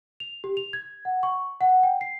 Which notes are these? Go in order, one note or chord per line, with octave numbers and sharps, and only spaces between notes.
F7
G4
F7
G#6
F#5
C#6
F#5
G5
C7